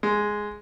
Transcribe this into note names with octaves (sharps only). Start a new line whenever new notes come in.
G#3